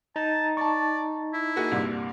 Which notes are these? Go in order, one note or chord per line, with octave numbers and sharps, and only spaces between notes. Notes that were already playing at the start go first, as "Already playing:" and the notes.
D#4 A5 A#5
D5 A5 C#6
E4
A#3 F#4 G#4
C2 G2 A#2